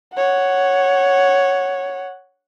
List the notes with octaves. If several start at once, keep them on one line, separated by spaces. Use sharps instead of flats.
C#5 F#5